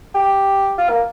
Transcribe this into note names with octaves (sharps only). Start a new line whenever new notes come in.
G4
F4
A#3